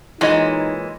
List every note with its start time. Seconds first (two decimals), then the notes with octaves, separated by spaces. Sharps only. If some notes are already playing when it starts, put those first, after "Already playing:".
0.21 A#2 E3 G#3 D#4 F4 C#5 D#5